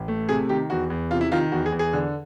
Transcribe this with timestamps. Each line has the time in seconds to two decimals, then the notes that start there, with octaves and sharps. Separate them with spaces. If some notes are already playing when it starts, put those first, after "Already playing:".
Already playing: A1
0.08 A3
0.29 C3 G#4
0.49 D#3 G4
0.70 E2 F#4
0.90 E2
1.11 C3 F4
1.21 E4
1.32 D#3 F4
1.52 E2 F#4
1.66 G#4
1.72 E2
1.79 G#4
1.93 D3